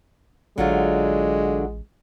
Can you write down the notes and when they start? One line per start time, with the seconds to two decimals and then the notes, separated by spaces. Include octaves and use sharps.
0.58 A1 D3 F#3 G#3 F4